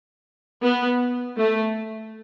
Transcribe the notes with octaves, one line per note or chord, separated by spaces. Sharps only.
B3
A3